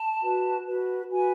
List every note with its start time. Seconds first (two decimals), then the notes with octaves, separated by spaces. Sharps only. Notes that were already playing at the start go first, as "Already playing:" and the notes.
Already playing: A5
0.22 F#4 B4
0.66 F#4 B4
1.11 F#4 B4 G#5